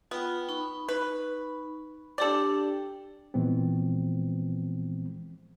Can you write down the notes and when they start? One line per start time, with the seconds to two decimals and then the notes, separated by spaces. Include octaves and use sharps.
0.11 B3 F4 G5
0.49 D#4 B5 C#6
0.88 B4
2.18 D4 G4 A4 D5 G5
3.34 A#2 E3 F3 G#3 B3 C4